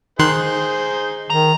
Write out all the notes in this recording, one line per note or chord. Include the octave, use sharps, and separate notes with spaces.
D#3 D#4 G#4 C5 C6 F#6
D#3 A#5